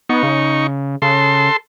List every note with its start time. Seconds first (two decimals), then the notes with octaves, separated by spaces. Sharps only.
0.09 B3 D#4 C#6
0.23 C#3
1.02 C#3 A4 C6